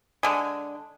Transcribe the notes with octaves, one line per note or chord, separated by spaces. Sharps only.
D3 G#3